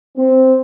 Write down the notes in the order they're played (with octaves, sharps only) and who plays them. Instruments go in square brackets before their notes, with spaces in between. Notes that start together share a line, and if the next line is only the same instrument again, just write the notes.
[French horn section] C4